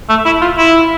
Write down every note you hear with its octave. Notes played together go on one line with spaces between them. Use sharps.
A3
E4
F4
E4